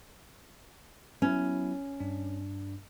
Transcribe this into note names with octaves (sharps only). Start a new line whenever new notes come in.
F#3 B3 C#4 E4
G2 D4